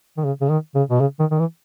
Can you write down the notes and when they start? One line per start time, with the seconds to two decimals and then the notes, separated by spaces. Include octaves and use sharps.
0.17 D#3
0.24 C#3
0.41 C#3
0.50 D#3
0.75 C#3
0.90 B2
1.01 C#3
1.19 D#3
1.31 D#3
1.39 E3